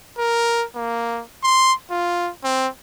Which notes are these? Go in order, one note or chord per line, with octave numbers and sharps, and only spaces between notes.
A#4
A#3
C6
F4
C4